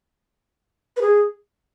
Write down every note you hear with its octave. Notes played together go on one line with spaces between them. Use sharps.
B4
G#4